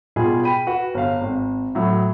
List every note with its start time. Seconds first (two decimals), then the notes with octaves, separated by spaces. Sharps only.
0.16 B2 G3 F4 G#4
0.43 G5 B5 D#7
0.67 F#4 B4
0.94 G1 F5
1.21 G#1
1.75 A2 F#3